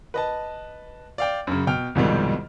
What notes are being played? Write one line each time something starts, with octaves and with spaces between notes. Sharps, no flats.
B4 D#5 A5
D5 F5 G5
F#2 C#3
B2 G5 F6
C2 F2 G#2 B2 D#3 G3